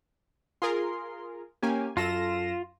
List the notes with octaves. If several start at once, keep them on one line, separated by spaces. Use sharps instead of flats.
F4 G#4 A#4 C6
A#3 C#4 G4 G#5
F#2 F4 A4 A#6 E7